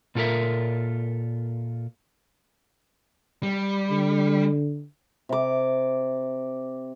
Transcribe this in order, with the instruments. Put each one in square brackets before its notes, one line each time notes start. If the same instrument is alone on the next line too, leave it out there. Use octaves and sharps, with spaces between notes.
[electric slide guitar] A#2 F4 A4 A#4 E5
[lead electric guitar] G3
[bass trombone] D3
[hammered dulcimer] C3 D6